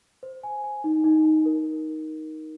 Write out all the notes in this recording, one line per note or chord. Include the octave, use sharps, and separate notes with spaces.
C5
G#5
G#5
D#4
D#4
D#4
A#4